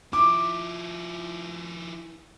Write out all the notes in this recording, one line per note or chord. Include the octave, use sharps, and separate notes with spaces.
F3 E4 D6